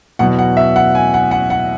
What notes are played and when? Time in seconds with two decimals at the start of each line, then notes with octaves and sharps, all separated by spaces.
0.19 E2 B2 F#3 F#5
0.39 F#5
0.57 E5
0.76 F#5
0.95 G#5
1.14 F#5
1.31 F#5
1.50 F#5